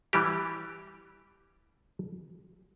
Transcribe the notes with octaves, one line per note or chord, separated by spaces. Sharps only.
E3 G3 G4